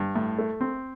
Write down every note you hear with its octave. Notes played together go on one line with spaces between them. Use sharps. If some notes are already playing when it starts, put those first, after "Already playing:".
Already playing: G2
A2
A3
C4